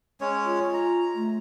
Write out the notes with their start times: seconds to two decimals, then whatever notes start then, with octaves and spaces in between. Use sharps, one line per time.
0.21 G#3 C#4 C#5
0.45 F4
0.73 A#5
1.15 A3